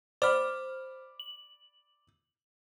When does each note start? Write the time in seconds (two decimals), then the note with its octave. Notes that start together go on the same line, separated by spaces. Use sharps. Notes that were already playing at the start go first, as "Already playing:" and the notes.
0.22 C5 D5 B5 F6
1.20 F#7